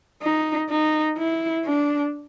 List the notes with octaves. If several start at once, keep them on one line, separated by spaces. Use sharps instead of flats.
D#4
D#4
E4
D4